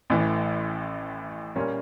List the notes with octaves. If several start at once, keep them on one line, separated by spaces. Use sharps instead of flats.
A1 A2 E3
A#2 G3 A#3 C#4